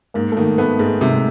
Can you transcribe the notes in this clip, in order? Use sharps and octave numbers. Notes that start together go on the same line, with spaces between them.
G#2 A#3
A3
D#3 A#3
A3 B3
G#2 G#3
C3 G3